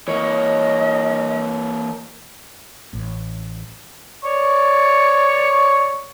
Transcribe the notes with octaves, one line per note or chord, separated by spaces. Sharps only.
E3 A#3 C#5 D#5
A1
C#5 D5 C#6